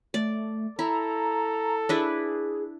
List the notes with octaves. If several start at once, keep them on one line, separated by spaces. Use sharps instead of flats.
A3 D5
E4 A4 A#5
D4 E4 G#4 B4